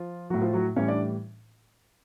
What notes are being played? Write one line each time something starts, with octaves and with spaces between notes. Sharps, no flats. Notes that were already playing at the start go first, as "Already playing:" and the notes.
Already playing: F3 F4
A2 F#3 F#4
F3 F4
F#3 F#4
A2 E3 G3 C#4 C#5
D4 D5